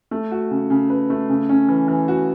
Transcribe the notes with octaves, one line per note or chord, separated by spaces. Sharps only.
A3
F#4
C#3
C#3
B4
A3
C#3
C#4
E3
E3
F#4